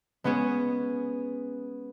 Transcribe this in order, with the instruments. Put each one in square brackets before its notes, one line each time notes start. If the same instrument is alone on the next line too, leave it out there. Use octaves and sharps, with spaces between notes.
[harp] G#3 B3 C#4 G#4